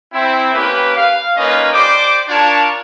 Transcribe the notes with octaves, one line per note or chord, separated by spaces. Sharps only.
C4 E4
A#3 C#4 G4 B4
F5
A#3 C#4 D#4 F4 B4 D#5
G4 C5 D5 D6
D4 F4 A#4 C#5 D5 A5